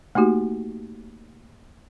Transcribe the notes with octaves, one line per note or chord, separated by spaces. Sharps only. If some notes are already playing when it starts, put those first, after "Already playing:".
A3 A#3 D#4 F#4 G4